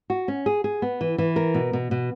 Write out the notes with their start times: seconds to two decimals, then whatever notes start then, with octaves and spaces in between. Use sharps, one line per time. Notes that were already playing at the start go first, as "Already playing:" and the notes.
0.10 F#4
0.28 C#4
0.46 G#4
0.64 G#4
0.82 B3
1.01 E3
1.18 E3
1.36 A#4
1.54 B2
1.73 B2
1.91 B2